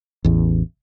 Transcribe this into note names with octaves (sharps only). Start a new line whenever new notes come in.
A1 E2